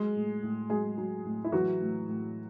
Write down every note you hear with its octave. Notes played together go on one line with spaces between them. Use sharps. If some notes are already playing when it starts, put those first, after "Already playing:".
Already playing: F#3 G#3 G#4
A2
A2
F#3 G#3 G#4
F#3
A2
E4
E3 F#3 F#4
A2
A2